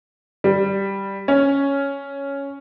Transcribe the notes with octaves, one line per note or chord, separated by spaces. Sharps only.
G3
C#4